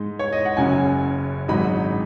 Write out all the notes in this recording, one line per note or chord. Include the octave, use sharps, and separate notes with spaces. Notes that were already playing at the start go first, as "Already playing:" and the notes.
Already playing: G#2 G#3 D#4
C#5
D#5
F#5
F#1 F#2 F#3 C#4 G#5
G#1 G#2 F#3 D#4 B5